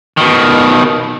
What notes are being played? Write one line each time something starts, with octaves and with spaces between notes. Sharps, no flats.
B2 D#3